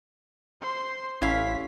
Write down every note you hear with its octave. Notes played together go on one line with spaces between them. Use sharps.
C5 C6
A1 C#4 E4 F5 B6